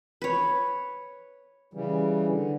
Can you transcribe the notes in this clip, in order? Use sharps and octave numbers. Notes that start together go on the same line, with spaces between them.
B4 C#5
C#3 E3 G3
D3